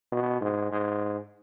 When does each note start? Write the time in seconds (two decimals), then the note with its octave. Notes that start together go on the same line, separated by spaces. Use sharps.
0.12 B2
0.41 G#2
0.71 G#2